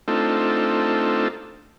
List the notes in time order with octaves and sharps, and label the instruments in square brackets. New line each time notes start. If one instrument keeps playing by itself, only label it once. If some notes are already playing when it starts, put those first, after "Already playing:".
[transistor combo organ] A3 C4 D4 D#4 F4 A4